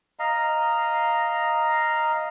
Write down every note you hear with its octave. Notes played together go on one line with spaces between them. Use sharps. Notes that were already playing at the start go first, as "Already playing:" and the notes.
D#5 F5 A#5